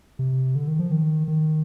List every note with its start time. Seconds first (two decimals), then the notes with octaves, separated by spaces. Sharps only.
0.19 C3
0.55 D3
0.68 D#3
0.79 F3
0.92 D#3
1.28 D#3